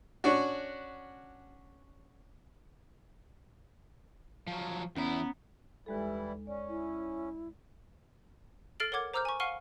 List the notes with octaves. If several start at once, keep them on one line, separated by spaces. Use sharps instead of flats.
C#4 D4 F#4
F3 F#3
E2 B3 C#4 E4 A#5
D#2 E3 G3 G#3 E4 A4
C#4 D5
E4
A4 F6 A6 C7 D7 F#7
A#4 C#5 F#5 D6 G#6
C5 A#5 D6 E6 F6 G6
G#5 C#6
F5 F#5 C#6 F6 D#7 G7